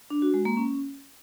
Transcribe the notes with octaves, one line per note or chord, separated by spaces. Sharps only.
D4
F#4
G#3
A#3
C#4